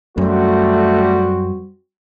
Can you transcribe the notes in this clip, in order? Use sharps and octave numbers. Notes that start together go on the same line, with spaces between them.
F#2 G3 A3 C4 F#4